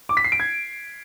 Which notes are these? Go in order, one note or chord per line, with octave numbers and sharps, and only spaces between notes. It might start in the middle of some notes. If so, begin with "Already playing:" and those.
D6
B6
C7
D7
G#6